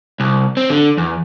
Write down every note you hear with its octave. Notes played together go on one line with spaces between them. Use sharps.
C2
C4
D3
E2